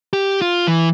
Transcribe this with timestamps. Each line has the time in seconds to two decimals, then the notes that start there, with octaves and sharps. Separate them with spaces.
0.13 G4
0.42 F4
0.67 E3